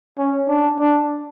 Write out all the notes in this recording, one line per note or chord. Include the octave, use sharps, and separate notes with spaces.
C#4
D4
D4